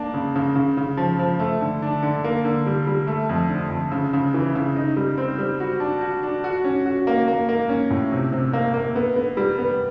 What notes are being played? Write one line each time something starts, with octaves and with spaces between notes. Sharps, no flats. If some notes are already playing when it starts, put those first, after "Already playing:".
Already playing: A#3 D4
C#3
C#3
C#3
C#3
F3
F3
A3
D3
D4
D3
A#3
D3
G3
G3
A3
F2
D3
F2
C#3
C#3
E3
C#3
D#4
G3
C4
G3
F#4
D4
F#4
D4
F#4
C#4
F#4
A#3
A#3
A#3
C#4
A2
C3
C3
A#3
A#3
B3
B3
G3
B3